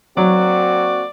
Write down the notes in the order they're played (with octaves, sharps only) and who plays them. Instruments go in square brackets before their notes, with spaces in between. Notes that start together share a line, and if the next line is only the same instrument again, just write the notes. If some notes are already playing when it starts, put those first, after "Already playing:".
[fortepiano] F#3 [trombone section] A#3 C4 F#4 [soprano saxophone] D5